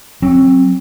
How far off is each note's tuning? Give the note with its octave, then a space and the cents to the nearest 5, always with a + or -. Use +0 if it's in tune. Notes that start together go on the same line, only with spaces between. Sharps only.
F#3 +0 C4 +25